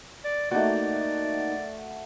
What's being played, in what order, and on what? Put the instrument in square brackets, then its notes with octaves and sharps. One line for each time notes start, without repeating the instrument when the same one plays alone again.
[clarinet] D5
[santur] A3 F#4 [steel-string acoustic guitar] A#3 D#4 [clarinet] D5